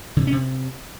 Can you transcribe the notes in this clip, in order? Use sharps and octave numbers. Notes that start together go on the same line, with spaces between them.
D3
C3
C#4
C3